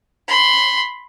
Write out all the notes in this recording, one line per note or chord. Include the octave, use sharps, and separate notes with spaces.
B5 C6